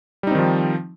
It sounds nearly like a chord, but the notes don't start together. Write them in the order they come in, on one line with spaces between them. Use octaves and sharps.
G3 D#4 C4 D#3 F3